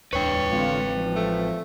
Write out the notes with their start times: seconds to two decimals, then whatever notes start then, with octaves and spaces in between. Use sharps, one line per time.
0.13 D1 E2 D4 B4 C#5 G5
0.51 A1 D3 G#3 C4 F4
0.87 F3
1.16 A3